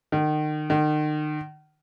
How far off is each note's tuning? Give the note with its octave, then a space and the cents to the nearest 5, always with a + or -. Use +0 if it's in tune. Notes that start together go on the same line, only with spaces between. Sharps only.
D#3 -35
D#3 -40